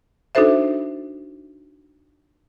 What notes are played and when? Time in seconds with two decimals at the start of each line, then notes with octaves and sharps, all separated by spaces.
0.35 D4 D#4 F#4 A4 C5 E5